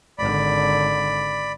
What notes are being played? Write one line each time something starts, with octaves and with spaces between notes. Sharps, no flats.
G#1 D3 D5 B5